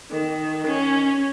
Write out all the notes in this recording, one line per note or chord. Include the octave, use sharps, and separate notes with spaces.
D#3
C#4